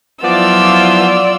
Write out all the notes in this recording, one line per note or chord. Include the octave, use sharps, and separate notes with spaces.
F3 F#3 B3 E4 F4 D5 E6